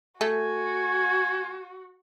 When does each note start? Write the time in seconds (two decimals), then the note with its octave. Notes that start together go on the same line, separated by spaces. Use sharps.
0.21 A3 F#4 G#5